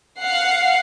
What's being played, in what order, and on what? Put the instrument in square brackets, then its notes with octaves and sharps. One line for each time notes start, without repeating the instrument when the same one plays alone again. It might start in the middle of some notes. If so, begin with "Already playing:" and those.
[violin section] F5 F#5 C7